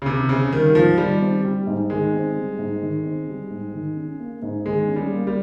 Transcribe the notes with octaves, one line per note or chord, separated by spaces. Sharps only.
C#3
C3 D#3
C#3 C4
D#3 G3
G#2 F3
D#3 G3
C4
G3
G#2
D#3 G#3
C4
G3
G#2
D#3
C4
G3
G#2
D#3
C#4
A#3
G#2
D#3 G#3
C#4
G3
A#3
G3